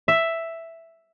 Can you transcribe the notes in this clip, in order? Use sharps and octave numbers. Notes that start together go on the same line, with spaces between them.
E5